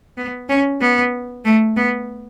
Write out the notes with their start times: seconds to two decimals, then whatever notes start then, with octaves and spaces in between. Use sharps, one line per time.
0.17 B3
0.49 C#4
0.81 B3
1.45 A3
1.77 B3